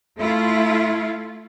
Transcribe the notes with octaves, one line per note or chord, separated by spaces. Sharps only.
A3 E4 F4